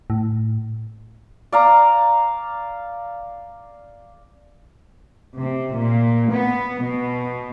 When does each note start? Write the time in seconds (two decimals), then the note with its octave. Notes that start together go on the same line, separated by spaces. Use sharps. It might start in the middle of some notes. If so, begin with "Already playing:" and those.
0.10 A2
1.52 D5 F5 A#5
5.37 C3
5.75 A#2
6.31 B3
6.82 B2